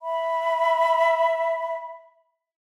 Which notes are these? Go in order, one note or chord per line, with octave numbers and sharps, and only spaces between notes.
E5 B5